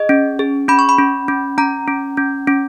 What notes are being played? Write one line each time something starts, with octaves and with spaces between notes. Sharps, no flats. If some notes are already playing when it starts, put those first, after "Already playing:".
Already playing: G#4 D#5
C#4
G#4
C#4 B5
C#6
B5
C#4
C#4
C#4 A#5
C#4
C#4
C#4